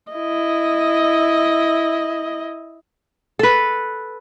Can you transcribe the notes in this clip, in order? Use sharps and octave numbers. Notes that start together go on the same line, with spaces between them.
E4 D#5
A4 B4